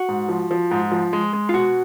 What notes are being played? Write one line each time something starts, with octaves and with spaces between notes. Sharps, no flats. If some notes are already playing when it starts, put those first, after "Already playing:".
Already playing: F#4
G#2
F3
F3
G#2
F3
G#3
G#3
F4
B2 F#4